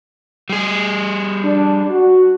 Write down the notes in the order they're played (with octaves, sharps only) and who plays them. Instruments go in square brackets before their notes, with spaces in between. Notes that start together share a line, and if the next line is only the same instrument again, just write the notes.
[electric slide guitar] G3 G#4
[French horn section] D4
F#4